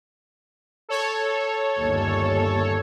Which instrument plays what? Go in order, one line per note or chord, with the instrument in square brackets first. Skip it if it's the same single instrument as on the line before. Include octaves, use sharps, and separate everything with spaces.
[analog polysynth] A4 C#5
[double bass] G1 D#2